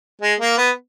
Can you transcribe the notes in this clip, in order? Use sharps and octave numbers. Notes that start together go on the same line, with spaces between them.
G#3
A#3
B3